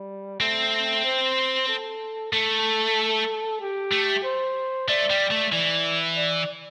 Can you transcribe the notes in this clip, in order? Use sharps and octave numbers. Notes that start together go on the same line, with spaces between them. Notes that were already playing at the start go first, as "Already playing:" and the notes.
Already playing: G3
A3 C4
C5
A4
A3 A4
G4
A3
C5
A3 D5
G3
A3
E3 D5
D5